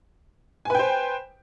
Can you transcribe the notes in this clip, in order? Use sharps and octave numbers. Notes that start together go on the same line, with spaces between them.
B4 C5 G5 G#5